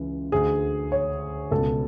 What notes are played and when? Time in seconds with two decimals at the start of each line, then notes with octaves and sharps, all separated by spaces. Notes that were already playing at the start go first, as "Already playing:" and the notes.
Already playing: C#2 C#3 E3
0.32 D2 D3 G#4
0.92 C#5
1.51 C#2 B2 A4